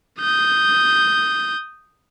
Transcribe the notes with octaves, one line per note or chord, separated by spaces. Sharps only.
D#6 G6